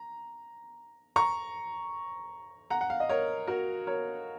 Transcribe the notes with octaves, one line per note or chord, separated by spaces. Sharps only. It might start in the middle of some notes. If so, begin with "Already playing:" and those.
Already playing: A#5
A#5 C#6
F#5 A#5
F#5
F5
D#5
A#4 C#5
F#4 A#4
A#4 C#5